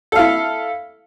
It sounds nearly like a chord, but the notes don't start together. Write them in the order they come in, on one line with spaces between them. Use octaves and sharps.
A4 F5 E4